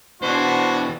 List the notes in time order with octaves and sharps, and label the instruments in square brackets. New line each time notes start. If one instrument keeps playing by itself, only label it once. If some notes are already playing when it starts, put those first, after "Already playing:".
[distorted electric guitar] B2 E3 [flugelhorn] D4 [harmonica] F#4 [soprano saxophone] C5